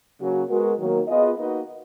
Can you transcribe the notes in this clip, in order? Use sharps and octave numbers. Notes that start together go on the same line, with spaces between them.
C#3 F#3 A#3 C#4 F#4
G#3 B3 F#4 A#4
D#3 F#3 A#3
B3 F4 G#4 D#5
A#3 D#4 F#4 B4 D#5